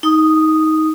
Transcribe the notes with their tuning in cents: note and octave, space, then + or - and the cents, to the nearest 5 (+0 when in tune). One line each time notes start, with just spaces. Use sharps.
D#4 +20 D#6 -5